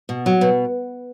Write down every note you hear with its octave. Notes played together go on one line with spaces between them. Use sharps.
B2
F#3
B2